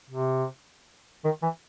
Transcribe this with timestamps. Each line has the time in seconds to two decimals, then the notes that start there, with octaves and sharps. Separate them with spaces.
0.10 C3
1.24 D#3
1.42 E3